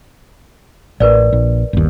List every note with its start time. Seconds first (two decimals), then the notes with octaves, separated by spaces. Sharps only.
1.00 A1 A#4 B4 D5
1.33 A#1
1.73 G1 D#2